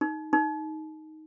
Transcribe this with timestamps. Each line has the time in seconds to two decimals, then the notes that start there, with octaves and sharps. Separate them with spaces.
0.01 D#4
0.33 D#4